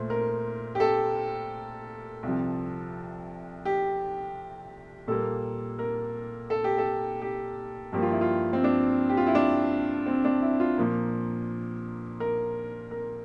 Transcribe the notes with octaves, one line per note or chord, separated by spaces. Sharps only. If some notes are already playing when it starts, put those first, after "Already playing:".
Already playing: A#2 A3 C5
A#4
G4
A4
C2 C3 F3
G4
A#2 G3 A#3 A4
A#4
A4
G4
A4
G4
G2 F3 A#3 G4
F4
E4
F4
C4
D4
G4
F4
E4
D4
C4
D4
E4
F4
A#2 F3 A#3
A#4
A#4